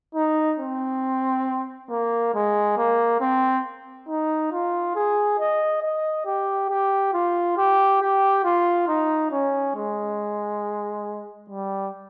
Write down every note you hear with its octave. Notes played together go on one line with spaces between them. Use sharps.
D#4
C4
A#3
G#3
A#3
C4
D#4
F4
G#4
D#5
D#5
G4
G4
F4
G4
G4
F4
D#4
C#4
G#3
G3